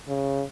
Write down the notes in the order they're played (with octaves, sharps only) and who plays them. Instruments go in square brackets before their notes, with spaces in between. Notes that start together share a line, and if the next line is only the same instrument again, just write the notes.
[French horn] C#3